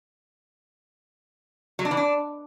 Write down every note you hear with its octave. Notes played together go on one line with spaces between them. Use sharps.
F#3
D4
E3
D4